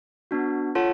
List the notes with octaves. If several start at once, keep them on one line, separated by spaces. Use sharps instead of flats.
B3 D4 F#4
F4 A4 C#5 F#5 A5